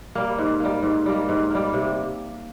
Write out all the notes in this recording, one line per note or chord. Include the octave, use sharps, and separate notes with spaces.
G3 A#3
G#2
G3 A#3
G#2
G3 A#3
G#2
G3 A#3
C3